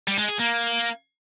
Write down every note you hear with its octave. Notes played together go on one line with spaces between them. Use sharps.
G3
G#3
G#4
A#3